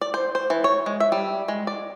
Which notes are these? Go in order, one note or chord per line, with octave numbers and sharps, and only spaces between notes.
D5
C5
C5
E3
C#5
G#3
E5
G3
G#3
D5